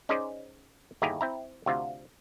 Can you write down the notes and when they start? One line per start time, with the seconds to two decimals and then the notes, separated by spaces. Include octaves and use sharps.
0.09 C#4 D#4 G#4 C5 D5
1.02 G1 D#2 E4 G4 G#4 A#5
1.21 C4 E4 A#5
1.66 D2 C3 F4